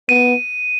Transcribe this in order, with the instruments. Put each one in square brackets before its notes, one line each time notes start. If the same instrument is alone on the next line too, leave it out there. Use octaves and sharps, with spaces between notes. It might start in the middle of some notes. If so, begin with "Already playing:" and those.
[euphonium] B3 [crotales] D#7